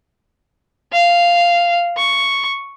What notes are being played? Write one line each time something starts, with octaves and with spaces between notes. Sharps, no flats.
F5
C#6